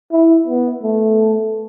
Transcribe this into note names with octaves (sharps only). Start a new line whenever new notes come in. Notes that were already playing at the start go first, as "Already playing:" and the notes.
E4
B3
A3